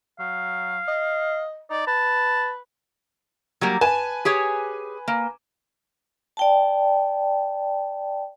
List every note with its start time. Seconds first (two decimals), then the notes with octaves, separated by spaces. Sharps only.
0.20 F#3 F5
0.88 D#5
1.71 D#4 D5
1.87 B4 A5
3.61 F#3 G3 A#3
3.81 B4 G#5 A5
4.25 G4 G#4 C#5
5.08 A#3
6.37 D5 G5 A5